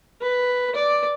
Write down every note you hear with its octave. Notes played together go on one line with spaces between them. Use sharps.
B4
D5